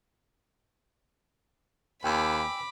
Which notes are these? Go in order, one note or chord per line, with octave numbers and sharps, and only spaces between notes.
D#2 G5 G#5 B5 D6 E6